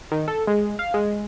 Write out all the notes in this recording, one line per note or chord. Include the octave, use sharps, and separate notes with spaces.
D#3
A4
G#3
F5
G#3